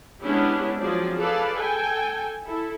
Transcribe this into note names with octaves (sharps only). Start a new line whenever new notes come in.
G#3 B3 C#4 D4 E4 G4
F3 F#3 C4 G#4 D5
G#4 A4 B4 D5 F5
A4 G5 G#5
E4 A4